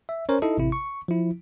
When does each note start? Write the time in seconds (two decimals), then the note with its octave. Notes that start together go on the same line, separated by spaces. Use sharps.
0.09 E5
0.29 C#4 A#4 C5 C#5
0.42 D#4 E4 A4 D#5
0.57 A1 C3 E4
0.72 C#6
1.08 F3 E4